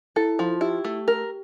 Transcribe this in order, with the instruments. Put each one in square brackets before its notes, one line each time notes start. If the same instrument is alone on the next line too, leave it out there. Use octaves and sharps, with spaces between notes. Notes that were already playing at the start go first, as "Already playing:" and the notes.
[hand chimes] E4 [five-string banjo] A4
[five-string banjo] F3 [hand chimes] F4
[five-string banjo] E4 [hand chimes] G4
[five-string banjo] A3
A#4